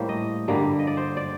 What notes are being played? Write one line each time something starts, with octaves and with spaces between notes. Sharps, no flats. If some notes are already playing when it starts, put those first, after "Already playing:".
Already playing: A2 G3 A#3 C5
D#5
G2 D3 G3 A#3
D#5
D5
C5
D5